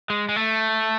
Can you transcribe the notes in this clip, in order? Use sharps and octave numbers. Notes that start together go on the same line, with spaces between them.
G#3
G#3
A3